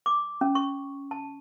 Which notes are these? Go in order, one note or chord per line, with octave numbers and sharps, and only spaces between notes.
D6
C#4
C#6
A5